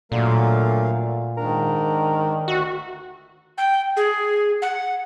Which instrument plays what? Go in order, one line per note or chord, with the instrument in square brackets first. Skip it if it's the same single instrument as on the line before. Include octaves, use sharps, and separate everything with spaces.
[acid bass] A#2 [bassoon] D3 [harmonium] F#3 A#4 F5 [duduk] A3
[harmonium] G#2 D4 [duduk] D#3 [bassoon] A#4
[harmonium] D2 E5 [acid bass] F#4
[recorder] G5
G#4
F#5